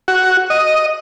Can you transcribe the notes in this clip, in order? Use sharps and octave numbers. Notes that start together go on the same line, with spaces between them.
F#4
D#5